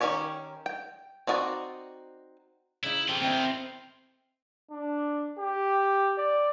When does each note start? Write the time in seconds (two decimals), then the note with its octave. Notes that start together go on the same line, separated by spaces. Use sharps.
0.01 D#3 A3 C#4 G4 C#5
0.66 G5
1.27 C4 D#4 F#4 A#4 D5
2.83 C#3 D#4 E4
3.08 D#3 C4 F4 G4 A4
3.22 C4 D#4 E4 G4
4.71 D4
5.39 G4
6.18 D5